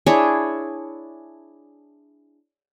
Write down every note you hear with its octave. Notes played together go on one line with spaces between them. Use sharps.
D4 E4 G#4 C#5